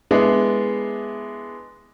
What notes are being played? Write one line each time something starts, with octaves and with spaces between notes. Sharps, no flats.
G#3 B3 D4 E4